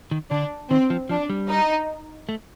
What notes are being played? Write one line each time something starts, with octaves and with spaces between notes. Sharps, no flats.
D#3
D3 D4
D#3 C4
F3
F3 D4
G3
D#4
A3